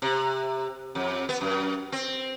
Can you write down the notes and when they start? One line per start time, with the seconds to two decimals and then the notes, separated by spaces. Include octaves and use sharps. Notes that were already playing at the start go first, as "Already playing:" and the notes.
0.02 C3
0.95 F2
1.29 B3
1.41 F#2
1.92 C4